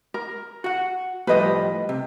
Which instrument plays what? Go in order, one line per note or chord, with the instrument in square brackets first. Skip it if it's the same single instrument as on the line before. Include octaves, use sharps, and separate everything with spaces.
[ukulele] A#4
[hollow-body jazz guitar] F#4 F#5
[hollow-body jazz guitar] A2 F3 G3 [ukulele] B4 D#5
[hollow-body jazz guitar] C3